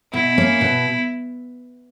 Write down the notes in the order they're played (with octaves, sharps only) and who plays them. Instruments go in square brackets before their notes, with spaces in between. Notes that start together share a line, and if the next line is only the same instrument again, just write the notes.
[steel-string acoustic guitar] B2 [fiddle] E4
[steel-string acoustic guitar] A#3 C#4
B2